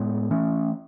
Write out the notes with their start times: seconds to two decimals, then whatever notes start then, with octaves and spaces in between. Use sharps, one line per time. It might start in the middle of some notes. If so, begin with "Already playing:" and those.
Already playing: A2 G#3 B3
0.31 E3 A3 C#4